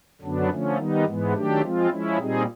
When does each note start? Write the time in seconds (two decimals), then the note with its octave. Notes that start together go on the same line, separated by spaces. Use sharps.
0.22 F#2 D3 F#3 B3 D4
0.49 D3 F3 A3 C#4
0.77 D#3 G3 B3 D#4
1.06 G#2 E3 G#3 B3
1.34 D#3 F#3 A3 D4 G4
1.62 F3 G#3 C4 F4
1.90 F3 G#3 C#4 E4
2.18 A#2 G3 C4 D#4 G#4